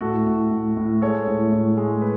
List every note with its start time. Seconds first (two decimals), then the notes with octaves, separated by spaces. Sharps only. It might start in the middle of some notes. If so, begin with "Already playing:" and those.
0.01 A2 F#4 A4
0.27 A2
0.51 A2
0.77 A2
1.02 G#3 A4 C#5
1.27 A2
1.52 A2
1.77 G#3
2.02 B4